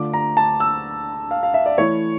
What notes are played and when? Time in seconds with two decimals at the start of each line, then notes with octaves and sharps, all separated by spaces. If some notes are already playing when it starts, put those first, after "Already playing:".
Already playing: D3 A3 D4 F4 D6
0.14 A#5
0.37 A5
0.60 E6
1.31 F5
1.43 F5
1.54 E5
1.66 D5
1.78 E3 A3 E4 C#5